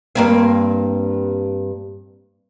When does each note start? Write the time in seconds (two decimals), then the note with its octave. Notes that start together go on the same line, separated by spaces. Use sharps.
0.15 G2 A#3 C4